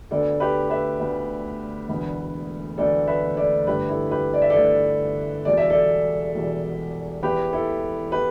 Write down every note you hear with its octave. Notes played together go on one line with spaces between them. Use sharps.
D2 D3 B3 A4 D5
G4 B4
B4 E5
D2 D3 B3
E1 D2 D3 B3
E1 D2 D3 B3 A4 D5
B4 E5
A4 D5
G1 G2 D3 A3 G4 B4
E4 A4
G4 B4
D5
E5
A4 D5
G1 G2 D3 A3
E1 E2 B2 G3 D5
E5
A4 D5
E1 E2 B2 G3
E1 E2 E3 B3 G4 B4
E4 A4
E3 B3 G4 B4